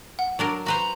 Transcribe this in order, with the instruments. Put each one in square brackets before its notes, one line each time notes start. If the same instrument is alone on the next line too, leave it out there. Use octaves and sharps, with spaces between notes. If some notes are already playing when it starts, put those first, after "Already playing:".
[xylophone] F#5
[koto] F#3 D4 A#4
[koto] F#4 B4 C5 [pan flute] A#5